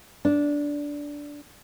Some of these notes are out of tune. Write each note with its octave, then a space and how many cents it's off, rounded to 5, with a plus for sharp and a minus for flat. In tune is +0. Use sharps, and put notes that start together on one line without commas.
D4 -10